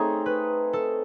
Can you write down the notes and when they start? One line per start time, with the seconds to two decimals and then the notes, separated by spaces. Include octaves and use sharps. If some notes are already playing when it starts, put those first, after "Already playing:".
Already playing: A3 C4 D#4 G#4 C#5
0.26 B4
0.73 A4